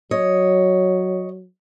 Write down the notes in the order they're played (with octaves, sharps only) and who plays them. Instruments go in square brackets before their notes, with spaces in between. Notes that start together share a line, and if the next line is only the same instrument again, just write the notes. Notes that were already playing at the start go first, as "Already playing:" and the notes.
[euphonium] F#3 [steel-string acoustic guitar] C#5 D#5